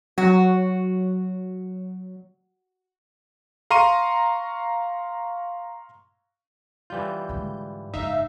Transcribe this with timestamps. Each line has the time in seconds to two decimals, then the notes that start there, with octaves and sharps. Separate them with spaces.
0.18 F#3 F#4
3.70 F5 A#5 C6 C#6 D#7
6.90 E3 G3 F4 G6
7.29 G#2 D3
7.94 F#1 G#2 D#4 E5 F5